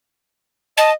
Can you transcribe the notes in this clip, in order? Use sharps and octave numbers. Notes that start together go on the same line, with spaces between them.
D#5 A5